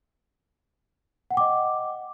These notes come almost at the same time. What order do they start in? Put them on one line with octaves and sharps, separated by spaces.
F#5 G5 D6 D#5